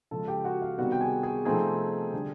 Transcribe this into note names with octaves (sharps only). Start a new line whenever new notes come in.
C#3 F3 G#3 A4 A5
G4 G5
F#4 F#5
F5
C3 D#3 G3 B3 F#4 F#5
G5
G#4 G#5
G#4 G#5
C3 F3 A3 C4 D#4 G#4 G#5
D3 G3